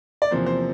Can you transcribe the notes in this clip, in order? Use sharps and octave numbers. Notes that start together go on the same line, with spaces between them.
D5
E2 C3 F3 A#3 C5
C5